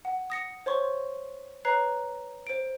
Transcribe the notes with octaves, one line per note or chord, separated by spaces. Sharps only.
F#5
D#6 A#6 C#7
C5 C#5 C6 C#6
B4 C#5 A#5 F#6 C7
C5 D7